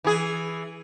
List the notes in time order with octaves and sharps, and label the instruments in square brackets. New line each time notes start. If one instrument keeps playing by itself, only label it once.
[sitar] E3 G#4